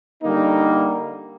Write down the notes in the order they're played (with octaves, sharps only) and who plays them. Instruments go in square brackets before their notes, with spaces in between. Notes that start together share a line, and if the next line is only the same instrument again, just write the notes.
[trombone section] D3 G3 A#3 D#4